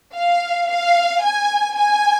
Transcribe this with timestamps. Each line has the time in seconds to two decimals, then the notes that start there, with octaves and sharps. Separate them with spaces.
0.15 F5
0.69 F5
1.22 G#5
1.76 G#5